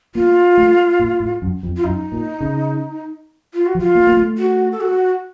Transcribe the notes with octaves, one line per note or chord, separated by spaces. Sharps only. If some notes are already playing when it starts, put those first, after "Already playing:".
A#3 F4
A3
A#2
A2
F#2
F2
F4
F#2 D#4
A#2
C#3
F4
F#4
F3
F4
A#3
A#3
A3
F#4
A4
F#4